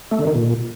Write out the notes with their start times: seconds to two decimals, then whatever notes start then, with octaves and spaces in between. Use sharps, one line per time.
0.11 A3
0.19 D3
0.27 D#3
0.35 A#2